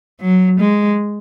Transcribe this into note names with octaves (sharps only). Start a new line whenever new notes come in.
F#3
G#3